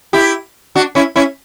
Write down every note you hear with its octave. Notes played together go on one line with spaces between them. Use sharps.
E4 G4
D4 F#4
C#4 E4
C#4 E4